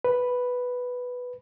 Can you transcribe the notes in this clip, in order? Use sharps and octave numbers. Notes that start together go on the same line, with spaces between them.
B4